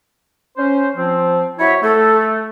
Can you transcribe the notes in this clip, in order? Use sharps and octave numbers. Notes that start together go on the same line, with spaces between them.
C#4 C5
F3 C4
F#3 E4 C#5 E5
A3 A4